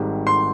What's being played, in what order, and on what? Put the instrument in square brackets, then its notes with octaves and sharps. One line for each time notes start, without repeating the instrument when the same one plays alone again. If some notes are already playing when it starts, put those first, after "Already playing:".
Already playing: [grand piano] G#1 G#2 G3
C6